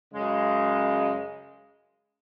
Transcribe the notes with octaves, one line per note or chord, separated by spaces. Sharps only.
F#2 C#3 G#3